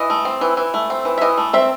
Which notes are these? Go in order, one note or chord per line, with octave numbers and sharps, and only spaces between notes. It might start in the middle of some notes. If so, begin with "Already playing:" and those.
Already playing: E3 D#5
A3
C4
E3
E3
A3
C4
E3
E5
E3 D#5
A3
C4 E5